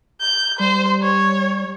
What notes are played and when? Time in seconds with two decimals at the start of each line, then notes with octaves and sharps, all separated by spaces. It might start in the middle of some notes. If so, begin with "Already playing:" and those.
0.21 G6
0.59 G3 C5
1.02 C#5